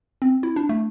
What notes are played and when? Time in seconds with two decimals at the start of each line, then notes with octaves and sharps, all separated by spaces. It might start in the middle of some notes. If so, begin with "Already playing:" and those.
0.22 C4
0.43 E4
0.56 D4
0.69 A3